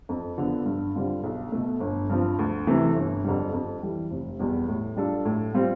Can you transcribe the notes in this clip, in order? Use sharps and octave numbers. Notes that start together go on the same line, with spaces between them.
F2
D3 F3 B3
G2
D3 G3 C4 F4
B1
B2 A3
G1
G2 F3 C4
D2
C3 E3 A3
G1
F2 D3 G3
F2
E3 G3
F1
E2 B2 G3 B3
A2
G3 D4 F4 A4
A2
G3 C4 F4